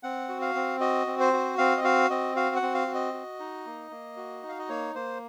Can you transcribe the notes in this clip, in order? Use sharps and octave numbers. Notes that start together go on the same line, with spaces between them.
C4 F#5
F#4
F5
C4
F#4 D#5
C4
C5
F#4
C4 F5
D#5
F#4 F5
C4 D#5
F#4 F5
F#5
C4
F5
F#4
D#5
F#4
D#4
A#3
A#3
F#4
D#4
F5
D#5
A#3 C#5
A#3 C5